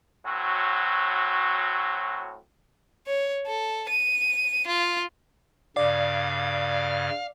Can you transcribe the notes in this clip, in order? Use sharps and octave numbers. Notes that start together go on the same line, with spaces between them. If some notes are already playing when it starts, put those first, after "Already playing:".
A2 F#3 C4 F#4
C#5
A4
D#7
F4
G2 C#3 D5 F5